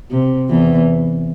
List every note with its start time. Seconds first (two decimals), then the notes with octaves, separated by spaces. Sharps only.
0.10 C3
0.49 E2 E3